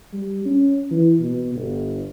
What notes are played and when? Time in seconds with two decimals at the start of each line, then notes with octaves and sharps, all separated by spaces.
0.13 G3
0.45 C#4
0.91 E3
1.20 B2
1.55 G1